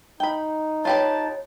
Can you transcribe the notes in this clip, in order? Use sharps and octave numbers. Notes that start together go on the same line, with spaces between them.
D#4 G5 B5
F4 G4 B4 C#5 A5